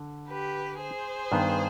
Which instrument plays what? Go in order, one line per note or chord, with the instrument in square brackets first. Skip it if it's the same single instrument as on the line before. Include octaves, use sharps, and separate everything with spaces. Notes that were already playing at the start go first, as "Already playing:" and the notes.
Already playing: [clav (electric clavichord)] D3
[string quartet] G4 B4
G#4 C5
[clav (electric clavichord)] G2 D#3 B3